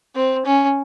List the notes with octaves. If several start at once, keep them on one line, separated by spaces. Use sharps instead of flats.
C4
C#4